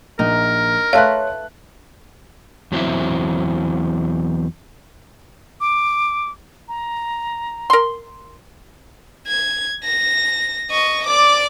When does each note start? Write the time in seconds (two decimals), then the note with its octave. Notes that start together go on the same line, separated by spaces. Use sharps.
0.19 A#1 D#4 A#4
0.93 A3 A4 B4 C#5 F5 C6 F#6
2.72 E2 F#3 C4 E4 E5
5.61 D6
6.68 A#5
7.70 A#4 C6
9.27 G#6
9.84 A#6
10.70 D#5 C#6
11.07 D5 D6